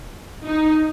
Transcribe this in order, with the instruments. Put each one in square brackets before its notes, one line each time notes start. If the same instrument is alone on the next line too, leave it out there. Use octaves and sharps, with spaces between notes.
[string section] D#4